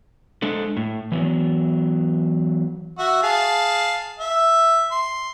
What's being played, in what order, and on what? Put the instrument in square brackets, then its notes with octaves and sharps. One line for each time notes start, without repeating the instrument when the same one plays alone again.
[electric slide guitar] G#3 D4 A4
A2
E3 F#3 B3
[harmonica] F#4 E5
G#4 F5 A5
E5
C6